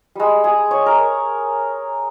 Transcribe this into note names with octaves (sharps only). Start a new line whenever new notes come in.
G3 G#3
G#4
C#5
A#4